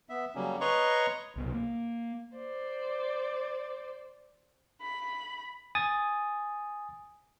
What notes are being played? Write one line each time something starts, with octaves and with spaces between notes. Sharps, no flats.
B3 E5
C#3 F#3 G3 A#3 C#4
B4 C#5 D#5 A#5 C6 C#6
C2 B2
A#3
C5 D5
B5
G#5 D#6 A6